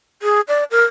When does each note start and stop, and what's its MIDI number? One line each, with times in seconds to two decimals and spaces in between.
0.22 0.41 68
0.48 0.64 74
0.71 0.85 70